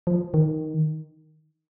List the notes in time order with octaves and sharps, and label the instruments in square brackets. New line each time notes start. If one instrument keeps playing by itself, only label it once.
[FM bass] F3
D#3